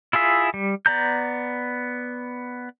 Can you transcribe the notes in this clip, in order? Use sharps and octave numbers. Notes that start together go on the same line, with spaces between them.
E4 F4 G#4 E5
G3
B3 D5 A#5 G6